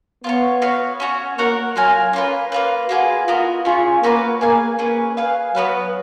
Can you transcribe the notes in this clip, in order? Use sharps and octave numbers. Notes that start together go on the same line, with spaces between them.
B3 F4 A#4 C#5
B3 F#4 C#5 F5
C#4 F#4 C#5
A#3 F#4 A#4 C#5 F#5
F#3 F4 A#4 F5 G#5
A#3 C#4 F4 B4
A#3 F4 B4
A#3 F4 F#4 G#4 B4
B3 F4 F#4 A#4 D#5
C#4 F4 G#4 C#5
A#3 C#4 F#4 B4 F5
A#3 G#4 B4 F5 G#5
A#3 C#4 G#4 B4
G#4 B4 F5
F#3 B3 F#4 B4 F5